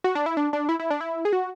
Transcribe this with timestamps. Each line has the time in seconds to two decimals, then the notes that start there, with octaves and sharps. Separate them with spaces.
0.04 F#4
0.15 D4
0.26 E4
0.37 D4
0.53 D4
0.69 E4
0.80 E4
0.90 D4
1.01 E4
1.25 G#4
1.33 F#4